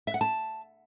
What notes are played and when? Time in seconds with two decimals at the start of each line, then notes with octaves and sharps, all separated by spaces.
0.07 E5
0.14 F#5
0.21 A5